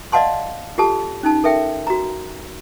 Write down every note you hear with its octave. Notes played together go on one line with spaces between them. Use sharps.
D5 D#5 F5 F#5 A5 C6
F4 G4 A4 A5
C#4 D#4 A5
A4 A#4 E5 G5
F#4 A#5